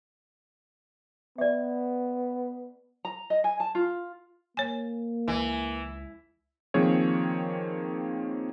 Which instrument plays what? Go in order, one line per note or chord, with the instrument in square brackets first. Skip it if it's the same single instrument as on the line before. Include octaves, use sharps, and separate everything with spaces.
[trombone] B3 [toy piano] D5 E5
[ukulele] A#5
D#5
G#5
A5
F4
[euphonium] A#3 [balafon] C#5 G#5
[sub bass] C#2 [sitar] E3
[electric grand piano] D#3 F3 A#3 C4 G#4 C#5